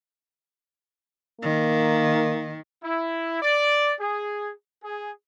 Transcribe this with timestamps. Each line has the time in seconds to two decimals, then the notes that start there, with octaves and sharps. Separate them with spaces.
1.40 D#3 A#3
2.84 E4
3.43 D5
4.01 G#4
4.84 G#4